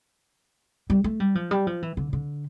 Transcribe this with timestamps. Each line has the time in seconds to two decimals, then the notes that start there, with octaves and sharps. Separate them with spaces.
0.90 G3
1.04 A3
1.20 G3
1.35 F3
1.51 G3
1.67 F3
1.82 E3
1.97 D3
2.13 D3